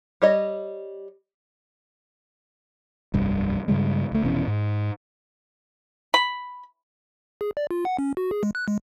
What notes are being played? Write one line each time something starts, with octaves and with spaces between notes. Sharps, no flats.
G3 C#5 D#5
F1 C2 G2
G2 C#3 G3 G#3
D2 A3
F1 B2 E3 C#4
G#2
B5
G#4
D5
F4
F#5
C#4
F#4
G#4
G#3
F#6
G#3